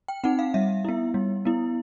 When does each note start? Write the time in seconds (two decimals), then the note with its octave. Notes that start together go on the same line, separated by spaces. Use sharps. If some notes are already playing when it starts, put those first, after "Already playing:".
0.08 G5
0.24 C4 D#4 F#5
0.39 F5
0.54 G3 E5
0.85 B3 E4
1.14 G3
1.45 B3 E4